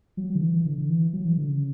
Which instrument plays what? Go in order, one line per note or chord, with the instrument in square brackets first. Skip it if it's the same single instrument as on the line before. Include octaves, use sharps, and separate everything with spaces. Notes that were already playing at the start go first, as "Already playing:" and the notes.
[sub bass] F#3
F#3
D3
E3
E3
D3
D3
E3
F#3
E3
D3
C#3